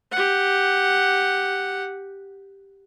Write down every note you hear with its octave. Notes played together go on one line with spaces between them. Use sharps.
G4 F#5